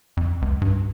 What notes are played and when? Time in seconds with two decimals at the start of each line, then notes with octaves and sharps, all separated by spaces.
0.17 F2
0.42 C#2
0.62 G2